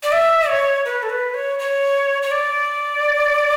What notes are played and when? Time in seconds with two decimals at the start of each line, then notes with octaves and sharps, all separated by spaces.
0.03 D5
0.12 E5
0.48 C#5
0.85 B4
1.03 A4
1.09 B4
1.34 C#5
1.59 C#5
2.22 C#5
2.31 D5